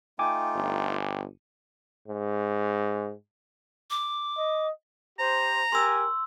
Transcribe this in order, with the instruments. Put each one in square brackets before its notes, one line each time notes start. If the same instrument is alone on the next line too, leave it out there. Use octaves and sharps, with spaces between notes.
[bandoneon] A3 D#4 F4 [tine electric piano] G5 G#5 D6
[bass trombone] G1
[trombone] G#2
[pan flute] D6
[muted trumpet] D#5
[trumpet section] G4 C5 [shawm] A#5
[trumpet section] G4 A#4 G#5 [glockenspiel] C6 E6